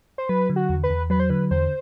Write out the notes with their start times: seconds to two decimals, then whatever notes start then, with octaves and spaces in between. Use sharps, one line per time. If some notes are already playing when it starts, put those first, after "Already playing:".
0.18 C5
0.29 F#3 B4
0.50 D3
0.56 F#4
0.69 E2
0.83 B4
0.90 E2
1.10 F#3 B4
1.20 C5
1.30 D3 B4
1.51 E2 C5